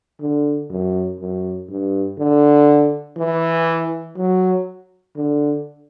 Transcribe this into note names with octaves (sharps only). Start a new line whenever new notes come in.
D3
F#2
F#2
G2
D3
E3
F#3
D3